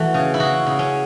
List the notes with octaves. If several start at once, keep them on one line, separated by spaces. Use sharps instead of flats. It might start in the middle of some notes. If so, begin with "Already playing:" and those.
Already playing: E3 A3 F#4
C#3
E4
C#3 F#4
C#3
C#4